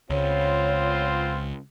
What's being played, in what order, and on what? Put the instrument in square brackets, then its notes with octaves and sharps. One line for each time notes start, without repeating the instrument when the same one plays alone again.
[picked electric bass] C#2 [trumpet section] B3 C4 F4 [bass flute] C#5